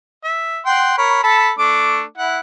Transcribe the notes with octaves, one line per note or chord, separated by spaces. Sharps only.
E5
F#5 G5 C6
A#4 C#5 B5
A4 A5 B5
A3 D4 D6
E4 F#5